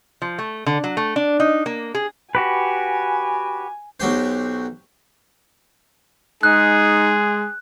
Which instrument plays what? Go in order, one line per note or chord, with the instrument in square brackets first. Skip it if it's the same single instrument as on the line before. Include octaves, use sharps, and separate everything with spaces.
[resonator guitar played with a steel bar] F3
A3
D3
F#3
A3
D4
D#4
A#3
G#4
[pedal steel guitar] F#4 G4 B4 [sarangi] G#5
[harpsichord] B1 F#3 G4 C5
[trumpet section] G#3 [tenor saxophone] D#4 [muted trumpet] G#4 [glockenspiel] F#6